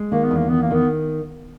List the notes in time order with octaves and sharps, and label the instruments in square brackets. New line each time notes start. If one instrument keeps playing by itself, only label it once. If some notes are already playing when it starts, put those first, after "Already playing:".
Already playing: [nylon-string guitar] G#3
[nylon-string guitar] D#3 [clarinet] A#3
[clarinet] B3
[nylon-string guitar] E2
[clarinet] A#3
[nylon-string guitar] D#3 [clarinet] B3
[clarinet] A#3
[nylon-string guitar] D#3 [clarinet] B3